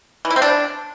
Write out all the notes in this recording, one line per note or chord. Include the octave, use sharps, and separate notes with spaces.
E3
E4
C4
D4